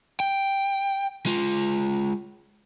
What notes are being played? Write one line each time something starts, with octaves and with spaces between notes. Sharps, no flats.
G5
G#3 F4